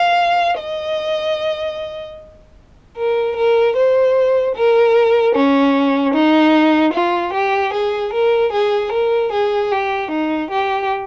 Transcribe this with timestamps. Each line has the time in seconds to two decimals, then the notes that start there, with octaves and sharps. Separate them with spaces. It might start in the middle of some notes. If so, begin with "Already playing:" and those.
Already playing: F5
0.59 D#5
2.97 A#4
3.36 A#4
3.77 C5
4.56 A#4
5.35 C#4
6.14 D#4
6.94 F4
7.33 G4
7.73 G#4
8.13 A#4
8.53 G#4
8.92 A#4
9.33 G#4
9.72 G4
10.12 D#4
10.51 G4